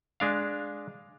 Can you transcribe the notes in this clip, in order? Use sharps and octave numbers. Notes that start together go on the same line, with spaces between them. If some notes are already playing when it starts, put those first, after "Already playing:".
G#3 D4 F5